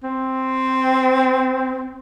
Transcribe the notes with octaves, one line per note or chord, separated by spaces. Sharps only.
C4